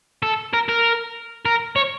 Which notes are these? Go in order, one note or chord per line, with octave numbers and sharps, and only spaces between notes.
A4
A#4
A#4
A#4
C#5